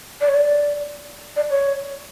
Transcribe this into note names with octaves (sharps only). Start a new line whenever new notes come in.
D5
C#5
D5
D5
C#5